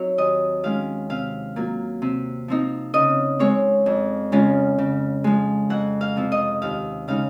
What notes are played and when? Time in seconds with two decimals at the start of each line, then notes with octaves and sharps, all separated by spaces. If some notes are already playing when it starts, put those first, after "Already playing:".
Already playing: F#3 C4 D#4 C#5
0.18 D#2 D#5
0.63 D#3 G#3 C#4 F5
1.10 C3 F5
1.56 F#3 A#3 F4
2.02 C3
2.48 F3 C4 D#4
2.94 C#3 D#5
3.39 G#3 C4 C#5
3.86 F2
4.32 C#3 G#3 C#4 F4
4.78 C#3
5.24 F3 G#3
5.70 F2 F#5
6.01 F5
6.16 C3 F3 C4 F4
6.32 D#5
6.62 D#2 F5
7.08 C#3 G#3 D#4 F5